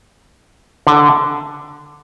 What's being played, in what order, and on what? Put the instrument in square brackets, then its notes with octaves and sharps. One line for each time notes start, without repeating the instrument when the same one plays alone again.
[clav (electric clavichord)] D3